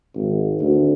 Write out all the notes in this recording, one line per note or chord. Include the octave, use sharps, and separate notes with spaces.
G#1
D2